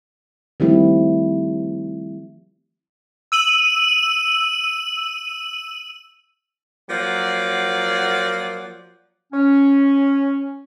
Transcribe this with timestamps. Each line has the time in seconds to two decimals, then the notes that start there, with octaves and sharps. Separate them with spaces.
0.60 D#3 F3 G3 A3 C4 E4
3.32 E6 D#7 F#7
6.90 F3 F#3 A#3 D5 F#5
9.33 C#4